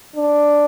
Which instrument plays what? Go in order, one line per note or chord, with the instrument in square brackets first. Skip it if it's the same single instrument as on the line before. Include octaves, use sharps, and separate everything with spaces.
[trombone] D4